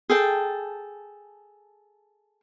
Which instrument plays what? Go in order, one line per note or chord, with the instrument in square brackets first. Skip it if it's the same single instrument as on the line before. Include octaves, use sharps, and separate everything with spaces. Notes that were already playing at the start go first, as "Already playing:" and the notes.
[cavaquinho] G#4 A4 G5 A5